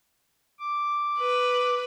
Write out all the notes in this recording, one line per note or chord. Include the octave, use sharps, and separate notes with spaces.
D6
B4